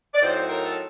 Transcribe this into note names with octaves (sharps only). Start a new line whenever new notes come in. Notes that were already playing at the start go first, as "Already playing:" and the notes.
D5
A2 F#3 C4 D#4 C5
A#4
A4